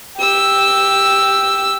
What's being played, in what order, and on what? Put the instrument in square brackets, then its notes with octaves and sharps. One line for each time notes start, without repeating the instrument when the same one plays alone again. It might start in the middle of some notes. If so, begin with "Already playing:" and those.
[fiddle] G4 E6